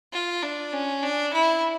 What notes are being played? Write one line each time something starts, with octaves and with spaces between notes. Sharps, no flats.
F4
D4
C#4
D4
E4